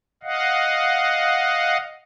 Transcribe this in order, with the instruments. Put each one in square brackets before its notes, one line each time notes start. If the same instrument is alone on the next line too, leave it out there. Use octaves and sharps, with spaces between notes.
[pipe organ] D#5 F5 F#5